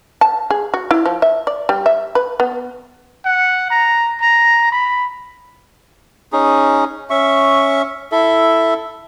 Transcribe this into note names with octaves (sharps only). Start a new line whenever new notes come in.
A5
G#4
F#4
E4
F3
E5
D5
G3
E5
B4
B3
F#5
A#5
A#5
B5
C#4 D#4 G#4
C#4 E5 C#6
E4 A4 E5